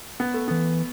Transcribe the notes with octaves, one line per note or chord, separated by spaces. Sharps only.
B3
A3
E3 B3